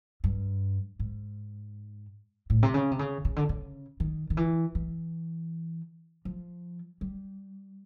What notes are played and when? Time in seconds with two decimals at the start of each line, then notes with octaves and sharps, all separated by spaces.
0.24 G2
0.99 G#2
2.50 A2
2.63 C3
2.74 C#3
2.91 C3
2.99 C#3
3.25 C#3
3.36 D3
3.49 C#3
4.00 D#3
4.30 D#3
4.37 E3
4.75 E3
6.25 F3
7.01 G3